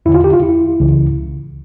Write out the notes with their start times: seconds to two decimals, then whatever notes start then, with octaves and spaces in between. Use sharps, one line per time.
0.06 E2 E4
0.09 D3
0.14 F4
0.24 G4
0.33 F4
0.43 E4
0.80 C#2 C#3 E3